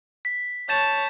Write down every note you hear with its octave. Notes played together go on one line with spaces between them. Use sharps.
B6
C#5 A5 G6 A6 E7